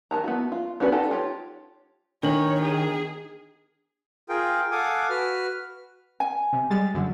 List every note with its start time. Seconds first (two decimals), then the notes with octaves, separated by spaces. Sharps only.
0.11 D#3 E3 A5 A#5
0.24 B3 E4 F#4
0.52 F4
0.80 B3 C#4 D4 F#4 B4
0.92 D#4 G4 A4 F#5 A5
1.11 F4 G4 C#5
2.23 D#3 D4 C#5 F#7
2.63 G#4
4.29 F4 G#4 A#4 G5
4.72 A4 F5 F#5 G#5 D6 D#6
5.10 F#4 B4 F6
6.20 G#5
6.53 C3
6.70 G3 G#3 A6
6.94 F#2 D3